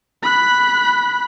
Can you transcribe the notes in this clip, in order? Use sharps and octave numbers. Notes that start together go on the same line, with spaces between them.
B5 F#6